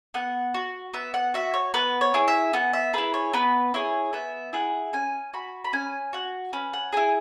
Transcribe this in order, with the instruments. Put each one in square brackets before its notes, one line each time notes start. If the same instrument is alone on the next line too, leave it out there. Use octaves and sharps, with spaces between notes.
[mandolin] B3 F#5
F#4
B3 E5
F#5
F#4 E5
C#5
B3 B4
C#5
E4 G#4
E5
B3 F#5
E5
E4 G#4 B4
C#5
B3 B4
E4 G#4 C#5
B3 E5
E4 G#4 F#5
C#4 G#5
F#4 B5
B5
C#4 G#5
F#4 F#5
C#4 B4
F#5
E4 G#4 G#5